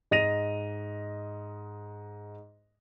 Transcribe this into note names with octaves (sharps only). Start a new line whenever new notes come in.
G#2 D#5 A#6 D#7 F7